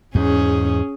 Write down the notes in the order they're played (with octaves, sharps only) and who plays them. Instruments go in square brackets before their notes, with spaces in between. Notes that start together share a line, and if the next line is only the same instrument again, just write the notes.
[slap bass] E2 G#2 [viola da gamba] C#4 G#4